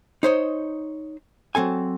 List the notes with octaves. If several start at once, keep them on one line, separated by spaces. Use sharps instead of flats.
D#4 C5 C#5 D#5
F#3 C4 A4 G#5